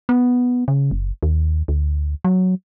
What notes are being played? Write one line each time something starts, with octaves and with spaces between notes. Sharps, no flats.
B3
C#3
F#1
D#2
D2
F#3